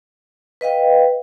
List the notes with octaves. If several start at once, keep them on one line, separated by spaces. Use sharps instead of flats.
B4 D#5 F5 G5